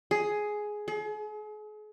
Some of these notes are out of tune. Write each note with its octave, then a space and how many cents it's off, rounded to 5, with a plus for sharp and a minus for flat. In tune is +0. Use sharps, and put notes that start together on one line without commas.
G#4 +10
G#4 +40